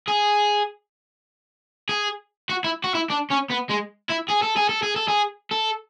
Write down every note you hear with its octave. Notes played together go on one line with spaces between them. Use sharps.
G#4
G#4
F#4
E4
F#4
E4
D4
C#4
B3
G#3
E4
G#4
A4
G#4
A4
G#4
A4
G#4
A4